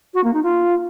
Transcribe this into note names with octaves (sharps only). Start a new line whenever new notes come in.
F#4
A#3
D#4
F4